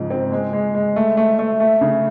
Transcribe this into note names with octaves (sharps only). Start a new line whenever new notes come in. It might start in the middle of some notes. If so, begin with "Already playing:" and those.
Already playing: G#2 C#3 F3
C4
G#3
G#3
G#3
A3
A3
A3
A3
C#3